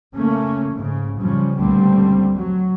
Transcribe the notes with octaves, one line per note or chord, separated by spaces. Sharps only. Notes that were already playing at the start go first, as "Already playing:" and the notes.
C#3 A3 A#3 C#4
G#2 C#3
C#3 F3 G3 C#4
C#2 A#2 D3 G3 A3 C4
F#3